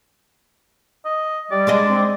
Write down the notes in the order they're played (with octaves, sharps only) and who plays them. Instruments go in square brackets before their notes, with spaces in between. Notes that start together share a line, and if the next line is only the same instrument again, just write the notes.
[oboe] D#5
[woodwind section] G3 [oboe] D5
[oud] G#3 D4 D#5
[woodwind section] C4